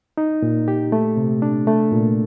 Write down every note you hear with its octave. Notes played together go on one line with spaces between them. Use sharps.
D#4
A#2
G4
A3
C3
D4
A3
A#2